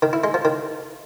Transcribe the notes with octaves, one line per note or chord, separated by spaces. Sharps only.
D#3
E4
G#3
F3
D#3